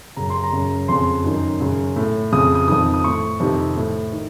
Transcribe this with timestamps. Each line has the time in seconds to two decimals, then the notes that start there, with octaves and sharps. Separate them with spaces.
0.17 F#2 C#3 A#5
0.30 C6
0.43 A#5
0.53 F#2 C#3
0.88 F2 C#3 C6
1.24 F#2 D#3
1.60 F#2 C#3
1.96 A2
2.32 F2 C#3 D#6
2.55 D#6
2.68 F2 D#3 D#6
2.94 D#6
3.04 A2 C#6
3.40 F2 C3 D#3
3.77 A2
4.12 D#3